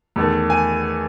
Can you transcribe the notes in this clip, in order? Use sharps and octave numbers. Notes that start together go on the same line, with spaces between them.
E2 D#3 A3
G#5